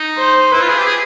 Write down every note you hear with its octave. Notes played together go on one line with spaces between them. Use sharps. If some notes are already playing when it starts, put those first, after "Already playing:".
Already playing: D#4
C5
E4 B4
F4
G#4
G4
G#4